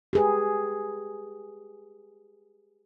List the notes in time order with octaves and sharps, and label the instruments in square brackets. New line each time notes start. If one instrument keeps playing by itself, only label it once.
[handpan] G4 G#4 B4